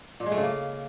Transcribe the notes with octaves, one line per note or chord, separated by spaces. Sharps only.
A#2
G#3
A3
C#3
A#3